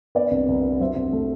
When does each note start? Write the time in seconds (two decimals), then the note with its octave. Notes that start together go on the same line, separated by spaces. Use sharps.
0.15 B3 B4 D5
0.31 C2
0.48 C2
0.65 B3
0.80 F#3 C5 E5
0.96 C2
1.13 A3